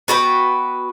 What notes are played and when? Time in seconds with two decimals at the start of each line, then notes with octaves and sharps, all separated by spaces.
0.08 B3 F#4 B4 G5